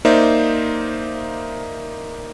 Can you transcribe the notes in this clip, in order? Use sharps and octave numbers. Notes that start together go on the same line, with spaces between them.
A#3 D#4 C5 D5 E5